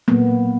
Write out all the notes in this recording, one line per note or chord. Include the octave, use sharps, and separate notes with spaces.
A#2 F#3 A#3 B3